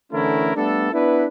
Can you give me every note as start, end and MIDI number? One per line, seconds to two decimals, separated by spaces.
0.13 0.54 50
0.13 0.54 52
0.13 0.54 57
0.13 0.54 61
0.13 0.54 64
0.13 0.54 70
0.56 0.90 55
0.56 0.90 57
0.56 0.90 59
0.56 0.90 62
0.56 0.90 69
0.93 1.26 59
0.93 1.26 62
0.93 1.26 64
0.93 1.26 71